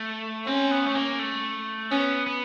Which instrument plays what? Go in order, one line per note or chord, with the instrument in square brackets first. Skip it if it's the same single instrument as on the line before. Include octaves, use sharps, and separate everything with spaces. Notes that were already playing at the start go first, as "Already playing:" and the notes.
Already playing: [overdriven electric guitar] A3
[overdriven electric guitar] C4 [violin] C#4
[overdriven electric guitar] B3
A3
A#3
A3
[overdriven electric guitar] B3 [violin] C#4
[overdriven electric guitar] B3